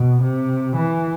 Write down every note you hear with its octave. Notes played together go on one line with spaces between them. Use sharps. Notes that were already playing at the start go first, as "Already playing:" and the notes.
Already playing: B2
C3
E3